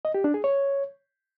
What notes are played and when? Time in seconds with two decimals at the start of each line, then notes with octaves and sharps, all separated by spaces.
0.05 D#5
0.14 G4
0.24 D4
0.34 G#4
0.44 C#5